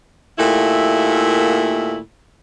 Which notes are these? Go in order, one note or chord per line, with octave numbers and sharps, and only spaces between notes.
D#2 A#2 A3 E4